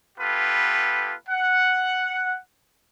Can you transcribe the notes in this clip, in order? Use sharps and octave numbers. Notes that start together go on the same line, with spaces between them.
B3 F4 G4 A4 B4
F#5